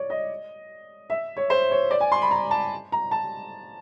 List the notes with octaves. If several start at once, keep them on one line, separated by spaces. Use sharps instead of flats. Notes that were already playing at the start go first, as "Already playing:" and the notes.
Already playing: C#5 D5
D#5
E5
C#5
C5
C#5
D5
G#5
C6
B5
A#5
A5
A#5
A5